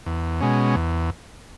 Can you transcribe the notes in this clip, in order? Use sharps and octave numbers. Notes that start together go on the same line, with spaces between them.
E2
B2 G#3 C#4
E2